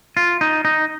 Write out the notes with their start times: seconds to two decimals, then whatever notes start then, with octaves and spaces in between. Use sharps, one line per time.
0.17 F4
0.41 D#4
0.65 D#4